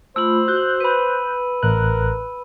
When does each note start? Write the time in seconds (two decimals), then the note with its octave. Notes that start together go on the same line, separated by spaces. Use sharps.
0.16 A3 F4 C5 B5 E6 F#7
0.48 F#4 F#6 G6
0.80 B4 B5 D#7
1.63 A1 A#4 F#6